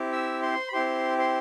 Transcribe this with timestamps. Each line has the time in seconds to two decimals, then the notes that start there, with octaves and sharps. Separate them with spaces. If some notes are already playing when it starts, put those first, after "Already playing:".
Already playing: C4 E4 G4
0.12 E5 E6
0.42 C5 C6
0.68 B5
0.73 C4 E4 G4 C5 C6
1.18 C5 C6